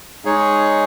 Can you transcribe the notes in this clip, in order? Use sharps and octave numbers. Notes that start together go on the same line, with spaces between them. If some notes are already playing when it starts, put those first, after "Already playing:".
G#3 D#4 G#4 C#5